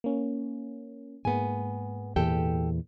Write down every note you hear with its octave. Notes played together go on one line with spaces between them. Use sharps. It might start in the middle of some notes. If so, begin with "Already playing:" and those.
A#3 C#4
G#2 G#3 A#3 B3 G#5
E2 A#2 E3 G4 A4 G5